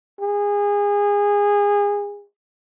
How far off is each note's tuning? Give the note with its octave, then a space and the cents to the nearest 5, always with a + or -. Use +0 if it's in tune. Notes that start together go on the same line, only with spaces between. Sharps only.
G#4 -25